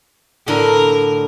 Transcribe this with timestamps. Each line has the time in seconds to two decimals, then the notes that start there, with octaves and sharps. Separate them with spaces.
0.48 A2 D3 A#4